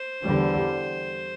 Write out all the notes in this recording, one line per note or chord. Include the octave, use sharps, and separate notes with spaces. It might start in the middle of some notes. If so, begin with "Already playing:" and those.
Already playing: C5
E2 D3 G3